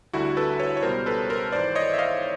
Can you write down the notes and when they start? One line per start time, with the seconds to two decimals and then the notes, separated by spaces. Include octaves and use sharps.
0.13 D2 D3 G3 E4 F#4
0.37 A4 B4
0.59 B4 C#5
0.77 C#5
0.82 C#2 B2 G3 A#4 C5
1.06 A4 B4
1.29 A#4 C5
1.52 G#1 G#2 E3 C5 D5
1.75 C#5 D#5
1.94 E5
1.98 D#5 F5